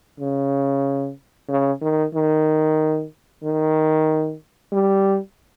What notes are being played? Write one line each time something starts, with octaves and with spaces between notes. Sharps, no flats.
C#3
C#3
D#3
D#3
D#3
G3